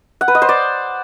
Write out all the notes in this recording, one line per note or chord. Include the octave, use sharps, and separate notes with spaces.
F#5
B4
D#5
C5
D5